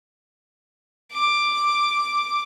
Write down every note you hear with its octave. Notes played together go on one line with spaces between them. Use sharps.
D6